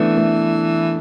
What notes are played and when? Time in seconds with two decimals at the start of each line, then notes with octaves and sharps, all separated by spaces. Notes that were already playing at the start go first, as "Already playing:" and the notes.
Already playing: E3 A3 B3 D4
0.18 A3